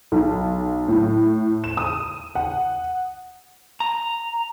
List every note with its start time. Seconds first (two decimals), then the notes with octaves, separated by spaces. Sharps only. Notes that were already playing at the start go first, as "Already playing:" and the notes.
0.12 B1
0.88 A2
1.64 E7
1.77 D#6
2.35 F#5
3.80 A#5